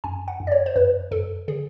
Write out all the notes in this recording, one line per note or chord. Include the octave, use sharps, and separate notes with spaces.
F#2 G#5
F#5
F#2
D5
C#5
C5
F#2 B4
F#2 A4
D3 G#4